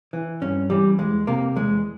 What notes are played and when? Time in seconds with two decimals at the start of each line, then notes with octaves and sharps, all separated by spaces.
0.13 E3
0.41 G2 C#4
0.70 E3 G3
0.98 E2 G#3
1.27 C3 A#3
1.56 E2 G#3